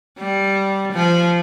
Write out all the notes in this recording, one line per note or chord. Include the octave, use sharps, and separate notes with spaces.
G3
F3